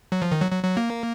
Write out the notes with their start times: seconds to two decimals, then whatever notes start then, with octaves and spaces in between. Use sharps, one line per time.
0.12 F#3
0.22 F3
0.32 D#3
0.41 F#3
0.51 F#3
0.63 F#3
0.77 A#3